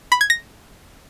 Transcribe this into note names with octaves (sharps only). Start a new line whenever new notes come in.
B5
G#6
A#6